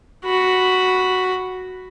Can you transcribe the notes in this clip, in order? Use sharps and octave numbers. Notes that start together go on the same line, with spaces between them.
F#4 B5